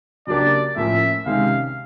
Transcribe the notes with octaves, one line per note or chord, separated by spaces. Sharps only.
C#3 F#3 A#3 D4 G4 D5
A2 F3 A#3 C#4 E5
C3 D#3 G#3 C#4 F5